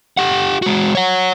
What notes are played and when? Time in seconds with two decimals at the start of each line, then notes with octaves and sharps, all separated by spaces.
0.17 G4 F#5
0.62 G#3 F#4
0.95 C#5 F#5